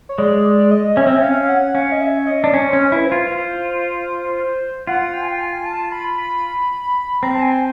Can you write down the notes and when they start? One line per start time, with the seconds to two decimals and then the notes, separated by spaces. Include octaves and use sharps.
0.09 C#5
0.18 G#3 D5
0.44 D5
0.71 D#5
0.97 C#4 E5
1.07 C4
1.17 C#4
1.23 F5
1.49 F#5
1.75 C#4 F5
1.92 D#5
2.01 E5
2.27 D#5
2.44 D4
2.54 C#4
2.70 C#4 C5
2.79 C#5
2.92 E4 B4
3.06 C5
3.12 F4
3.32 F4
4.87 F4 F#5
5.14 G5
5.22 G#5
5.28 G5
5.40 G#5
5.66 A5
5.92 B5
6.18 B5
7.23 C4 A#5
7.35 A5
7.42 G#5